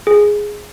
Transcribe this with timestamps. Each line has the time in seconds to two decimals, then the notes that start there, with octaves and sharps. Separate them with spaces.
0.07 G#4